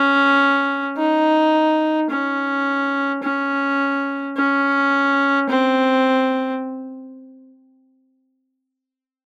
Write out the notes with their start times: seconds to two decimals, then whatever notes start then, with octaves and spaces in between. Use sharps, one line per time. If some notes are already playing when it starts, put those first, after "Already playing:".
Already playing: C#4
0.97 D#4
2.10 C#4
3.23 C#4
4.37 C#4
5.50 C4